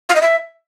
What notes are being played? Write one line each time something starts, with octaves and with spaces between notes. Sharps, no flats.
F5
D#5
E5